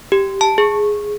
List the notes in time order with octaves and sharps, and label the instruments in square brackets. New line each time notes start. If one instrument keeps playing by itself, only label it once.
[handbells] G4
A5
G#4